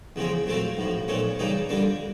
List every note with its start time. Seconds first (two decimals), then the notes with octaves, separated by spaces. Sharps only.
0.16 E2 C#3 F3 G#3 C4
0.46 A#2 F#3 A3 C4 F4
0.77 B1 A2 F3
1.08 B1 A#2 F3 A3 C#4
1.39 C#3 E3 G3 A#3 D#4
1.69 F2 D3 G3 A#3 D4